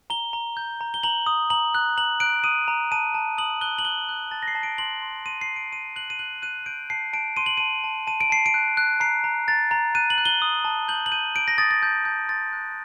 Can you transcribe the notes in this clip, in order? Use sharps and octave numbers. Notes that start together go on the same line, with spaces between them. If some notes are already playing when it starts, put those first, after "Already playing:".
A#5 G7
A#5
G6
A#5
G7
A#5 F#7
D#6
A#5 F#7
F#6
A#5 F#7
F#6 D7
D#6 D#7
A#5
A5 D#7
A5
D#6 F#7
F#6 G7
F#7
F#6 G7
F#6
A5 A6
A#6
C7
A5
D7
C6 F#7
C6
C6 D#7
C7
C6
D7
C6 D#7
F#6 F#7
D#7
F#6 F#7
F#6 D#7
G6 D7
A5 C7
A5 D7
C6 D#7
F#7
A5 D#7
A5
A5 D#7
D7
A5 C7
D7
F#6
F#6
A#5 C7
A#5
A#5 A6
A#5
F#6 D#7
F#7
F#6
G7
D#6
A5
G6 F#7
F#7
G6 D#7
G6 D7
A#6
D#6 A6
A6
A5 G6
A5 G6
C6 A6
F#6